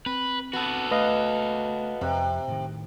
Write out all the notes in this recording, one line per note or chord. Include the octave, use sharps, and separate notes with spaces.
C4 B4
B3 F#4 A4
A3 B4 D#5 F5
F2 C3
A2 D#3